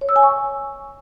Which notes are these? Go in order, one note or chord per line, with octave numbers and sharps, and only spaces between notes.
C#5
E6
G#5
C#6